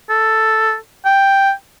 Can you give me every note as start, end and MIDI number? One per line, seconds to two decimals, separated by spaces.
0.10 0.75 69
1.06 1.52 79